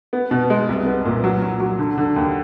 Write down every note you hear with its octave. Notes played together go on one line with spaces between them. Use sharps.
B3
B2
G#3
C2
B3
A#2
F#3
F#3
F#3
D3
D3
D#2